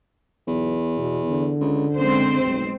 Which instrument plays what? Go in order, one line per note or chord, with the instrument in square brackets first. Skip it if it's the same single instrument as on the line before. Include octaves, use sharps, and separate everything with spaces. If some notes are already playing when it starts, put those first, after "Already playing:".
[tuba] B1 [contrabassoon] E2
[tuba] B2
D3
[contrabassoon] C#2
[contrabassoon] F#2 [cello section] G#3 C4 C5
[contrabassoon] F1 [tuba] B1